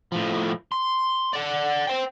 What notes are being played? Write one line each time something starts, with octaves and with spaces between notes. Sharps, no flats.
A2 F3
C6
D5 F#5
C5 G5